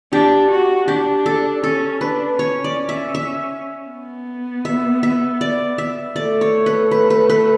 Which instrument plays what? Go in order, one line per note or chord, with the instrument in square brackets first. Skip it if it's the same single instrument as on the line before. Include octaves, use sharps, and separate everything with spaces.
[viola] D4 [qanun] G4
[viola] F#4
[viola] D4 [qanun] G4
[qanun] A4
[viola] C#4 [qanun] A4
[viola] D4 [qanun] B4
[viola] C#4 [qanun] C#5
[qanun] D5
E5
E5
[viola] B3
[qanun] E5
E5
D5
E5
[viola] A3 [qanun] D5
[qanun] C#5
B4
B4
B4
B4